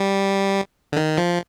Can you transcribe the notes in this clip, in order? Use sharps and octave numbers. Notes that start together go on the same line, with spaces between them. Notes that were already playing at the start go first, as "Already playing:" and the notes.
Already playing: G3
D3
D#3
F3